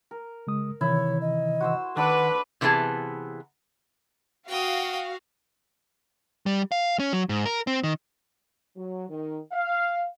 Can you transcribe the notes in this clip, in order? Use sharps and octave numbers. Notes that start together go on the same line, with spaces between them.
A#4
C#3 G#3 D#6
C3 D#3 E3 E4 C#5
D#5
F#4 C5 E6
D#3 D4 A4 B4 F#5 D6
C3 E3 B3 D4 G#4 A5
F#4 F5 G5 D#6
G3
F5
C#4
F#3
G#2
A#4
C4
D#3
F#3
D#3
F5